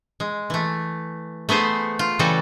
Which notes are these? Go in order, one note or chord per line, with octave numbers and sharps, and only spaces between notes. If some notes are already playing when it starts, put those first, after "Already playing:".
G#3
E3 A3
A3 B3 G#4 C5
F4
C#3 E3 G3 F#4 A4